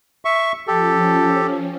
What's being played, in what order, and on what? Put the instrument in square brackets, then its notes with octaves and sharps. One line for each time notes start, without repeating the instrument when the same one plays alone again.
[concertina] E5 C#6
[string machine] F3 C#4 [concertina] G4 A4